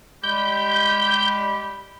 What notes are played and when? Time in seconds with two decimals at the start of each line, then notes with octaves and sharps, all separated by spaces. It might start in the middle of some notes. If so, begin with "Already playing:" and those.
0.24 G3 G#3 G4 B5 G6